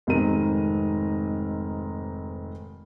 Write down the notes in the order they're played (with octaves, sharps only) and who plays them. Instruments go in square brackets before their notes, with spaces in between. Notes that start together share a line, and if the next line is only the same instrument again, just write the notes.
[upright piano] F1 G#2 D#3 C4 A#4 D#7